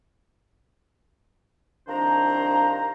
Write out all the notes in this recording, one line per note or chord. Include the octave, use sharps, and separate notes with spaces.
C2 D#3 F3 D4 C5 A#5